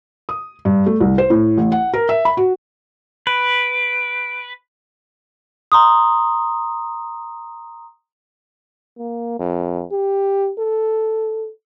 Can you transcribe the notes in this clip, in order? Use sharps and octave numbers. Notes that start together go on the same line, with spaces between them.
D#6
G2
A3
C2
C5
A2
A1
F#5
A#4
E5
B5
F#4
B4 D7
A#5 C6 D#6
A#3
F2
G4
A4